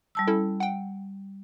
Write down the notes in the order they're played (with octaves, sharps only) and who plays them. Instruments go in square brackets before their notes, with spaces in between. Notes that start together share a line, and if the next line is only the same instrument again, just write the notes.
[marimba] G3 A5 E6
[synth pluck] C#4 E4 A4
F#5 G5